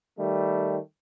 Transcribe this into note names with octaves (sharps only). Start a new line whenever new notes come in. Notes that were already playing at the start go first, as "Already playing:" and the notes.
D#3 G3 A3